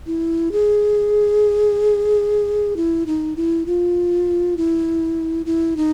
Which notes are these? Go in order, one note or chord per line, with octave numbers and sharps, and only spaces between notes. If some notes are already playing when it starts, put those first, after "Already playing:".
E4
G#4
E4
D#4
E4
F4
E4
E4
D#4